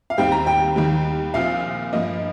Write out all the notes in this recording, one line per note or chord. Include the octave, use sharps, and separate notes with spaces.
F5
D#2 D#3 G3 C4 G4 G5
A#5
G5
D#2 D#3 G3
A#1 A#2 F3 C4 F4 F5
G2 F3 A#3 D#5